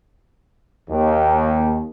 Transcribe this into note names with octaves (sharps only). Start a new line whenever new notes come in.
D#2